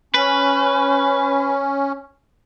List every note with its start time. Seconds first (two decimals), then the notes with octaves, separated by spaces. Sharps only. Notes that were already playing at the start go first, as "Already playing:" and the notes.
0.14 C#4 B4